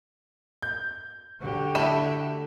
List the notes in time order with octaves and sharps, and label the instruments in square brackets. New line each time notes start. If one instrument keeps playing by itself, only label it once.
[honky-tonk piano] G6
[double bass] D3 [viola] F#4 G4
[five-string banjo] A3 E4 [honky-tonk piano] E5 E7